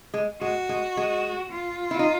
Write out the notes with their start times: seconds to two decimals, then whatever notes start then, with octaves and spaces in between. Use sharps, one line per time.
0.14 G#3
0.41 G#3 F#4
0.69 G#3
0.97 G#3
1.52 F4
1.91 E4
1.99 D#4